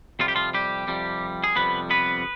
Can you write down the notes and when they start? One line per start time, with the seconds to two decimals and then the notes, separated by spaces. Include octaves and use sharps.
0.19 F2 C3 G3 F4
0.28 G4
0.35 F3 F4
0.54 G3 G4
0.87 F2 C3 G3
1.44 G#4
1.56 F2 C3 G3 B3 B4
1.90 B3 B4